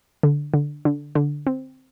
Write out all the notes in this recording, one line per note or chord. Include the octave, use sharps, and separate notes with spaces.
D3
D3
D3
D3
C4